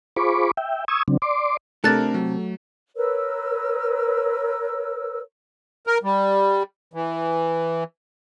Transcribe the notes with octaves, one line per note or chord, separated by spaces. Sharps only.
F4 G#4 C5 B5 C#6 D6
E5 G5
C#6 D#6 E6 G#6
C#3 F#3 C4 D4
D5 C6 D6
C3 A3 D4 A4 A#4 F#6 A6
F#3
A#4 B4 C#5 E6
A#4
G3
E3